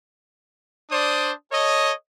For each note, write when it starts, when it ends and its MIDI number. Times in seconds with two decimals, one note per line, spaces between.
0.92 1.32 62
0.92 1.32 72
0.92 1.32 74
0.92 1.32 87
1.52 1.92 69
1.52 1.92 73
1.52 1.92 75